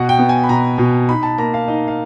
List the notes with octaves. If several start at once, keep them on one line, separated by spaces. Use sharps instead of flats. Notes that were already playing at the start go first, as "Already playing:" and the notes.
Already playing: B2 F#5
G5
B3
G#5
B5
B2 A#5
B2
D#4 B5
A5
A#3 A#5
F5
D#4 D#5
F5